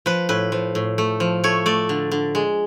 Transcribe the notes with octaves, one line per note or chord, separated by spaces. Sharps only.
F3 B4
A2 B4
F3
A2
A3
F3
A3 C#5
A3 D5
D3
D3
G#3